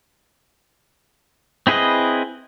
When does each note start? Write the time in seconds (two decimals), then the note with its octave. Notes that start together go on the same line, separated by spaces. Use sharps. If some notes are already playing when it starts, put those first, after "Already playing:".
1.67 C4 E4 G#4 B4 D#5